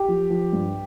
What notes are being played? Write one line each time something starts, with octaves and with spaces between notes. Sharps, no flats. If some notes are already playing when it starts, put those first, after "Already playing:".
Already playing: G4
F3
F3
G2